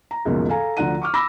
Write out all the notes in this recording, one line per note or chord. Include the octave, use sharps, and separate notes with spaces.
A#5
C#2 F#2 B2 D#3 F3 A#3
A4 F5 G#5 A#5
D2 D3 F3 F#5 A#5 D#7
C#6 D6 F6
B5 D6 E6 A#6